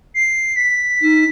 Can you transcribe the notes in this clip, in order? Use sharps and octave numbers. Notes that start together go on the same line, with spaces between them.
C7
B6
D#4